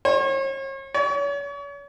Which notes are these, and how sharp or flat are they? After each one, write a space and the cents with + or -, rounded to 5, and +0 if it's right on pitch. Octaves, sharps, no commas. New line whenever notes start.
C#5 -40
C#5 +40